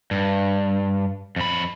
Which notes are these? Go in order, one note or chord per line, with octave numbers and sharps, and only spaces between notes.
G2
F2 B5